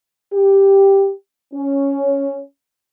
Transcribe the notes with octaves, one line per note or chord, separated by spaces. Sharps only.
G4
C#4